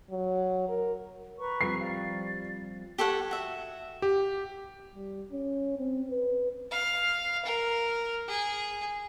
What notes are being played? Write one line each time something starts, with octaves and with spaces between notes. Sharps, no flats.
F#3
A#4
B4 A#5 C#6
F3 G3 C4 C7
D5 F5
G4 A4 C#5 F#5
F#4 E5
G4
G3
C#4
C4
B4
F5
A#4
G#4